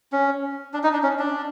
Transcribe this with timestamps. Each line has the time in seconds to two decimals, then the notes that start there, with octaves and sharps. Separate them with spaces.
0.12 C#4
0.74 D4
0.84 D#4
0.93 D4
1.03 C#4
1.19 D4